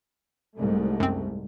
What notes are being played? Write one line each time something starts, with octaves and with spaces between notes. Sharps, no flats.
C2 G#2 A3
F#2 C4